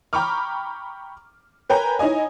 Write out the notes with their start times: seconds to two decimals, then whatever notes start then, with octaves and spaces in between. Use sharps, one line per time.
0.13 G5 A#5 B5 C#6 D6 F6
1.69 A#4 B4 C#5 G5 G#5 A#5
1.99 D#4 E4 C#5 D#5 G#5